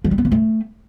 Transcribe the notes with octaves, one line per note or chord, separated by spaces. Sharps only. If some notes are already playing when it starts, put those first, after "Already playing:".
F3
G3
B3
A#3
A3